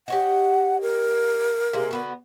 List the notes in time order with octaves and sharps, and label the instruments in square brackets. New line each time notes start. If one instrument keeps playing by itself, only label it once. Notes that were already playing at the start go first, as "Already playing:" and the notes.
[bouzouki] G4 C#5 D#5 [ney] F#5
[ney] A#4
[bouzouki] C3 G#3 A#3
D3 B3 F#4